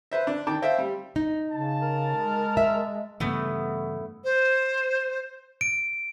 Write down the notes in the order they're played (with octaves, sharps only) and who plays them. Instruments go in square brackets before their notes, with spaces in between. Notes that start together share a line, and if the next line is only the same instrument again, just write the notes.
[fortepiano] B4 C5 E5
D4
D#3 G5 A5 D6
C5 E5 F5 G5
G3
[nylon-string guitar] D#4
[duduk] C#3 [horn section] A5
[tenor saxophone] A#4
[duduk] G#3
[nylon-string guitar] E5
[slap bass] G2 C#3 E3 [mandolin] A3 B3
[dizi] C5
[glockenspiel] D7